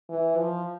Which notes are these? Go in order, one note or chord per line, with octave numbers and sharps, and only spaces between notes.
E3
F3